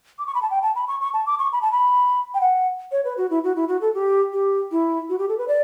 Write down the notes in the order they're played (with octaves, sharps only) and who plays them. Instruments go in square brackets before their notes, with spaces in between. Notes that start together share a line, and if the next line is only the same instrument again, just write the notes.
[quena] D6
C#6
B5
A5
G5
A5
B5
C#6
C#6
A5
D6
C#6
B5
A5
B5
G5
F#5
C#5
B4
F#4
E4
F#4
E4
F#4
A4
G4
G4
E4
F#4
G4
A4
B4
D5